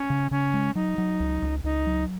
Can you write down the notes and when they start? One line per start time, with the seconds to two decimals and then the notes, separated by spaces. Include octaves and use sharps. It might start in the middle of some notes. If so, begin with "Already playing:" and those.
Already playing: C#4
0.10 C#3
0.31 C#3 C#4
0.54 G#3
0.75 F#3 D#4
0.98 F#3
1.20 C#2
1.42 C#2
1.64 C#2 D#4
1.86 F#3